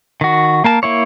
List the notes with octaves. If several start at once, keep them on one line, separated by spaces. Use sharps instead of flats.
D#3 F#4
A#3 A#4 A5
A#3 E4 C#5